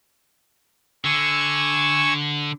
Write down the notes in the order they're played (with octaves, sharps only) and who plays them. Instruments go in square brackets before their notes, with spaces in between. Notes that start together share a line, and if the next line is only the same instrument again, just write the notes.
[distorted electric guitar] D3 [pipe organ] G#5 C#6 E6